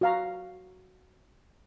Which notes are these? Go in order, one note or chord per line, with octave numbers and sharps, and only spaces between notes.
F#4 F5 A#5